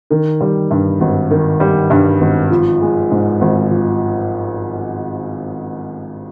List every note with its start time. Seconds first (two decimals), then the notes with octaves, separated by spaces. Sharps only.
0.10 D#3
0.41 G3
0.71 G2
1.00 G#1
1.31 D#3
1.60 G3
1.90 G2
2.21 G#1
2.51 F3
2.81 G#3
3.11 G#2
3.41 G#1
3.71 F3